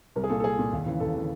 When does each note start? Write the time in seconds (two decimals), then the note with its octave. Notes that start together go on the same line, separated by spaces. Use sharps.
0.16 C2 A#4
0.24 G#4
0.30 A#2 A4
0.40 A4
0.44 C2 G#4
0.59 A#2
0.73 D#2
0.86 C#3 E3
1.00 D#2 A4
1.15 C#3 E3